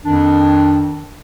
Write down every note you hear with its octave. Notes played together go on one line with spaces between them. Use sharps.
F2 D#3 D4